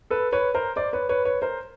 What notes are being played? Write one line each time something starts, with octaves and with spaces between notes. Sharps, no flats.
A4 B4
B4 C#5
A#4 C5
C5 D5
B4 C#5
B4 C#5
B4 C#5
A#4 C5